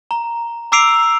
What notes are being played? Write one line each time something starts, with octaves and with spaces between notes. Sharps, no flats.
A#5
A#5 D6 E6 C7 D7 F7